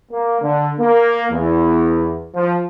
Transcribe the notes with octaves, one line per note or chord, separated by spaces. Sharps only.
A#3
D3
A#3
E2
F3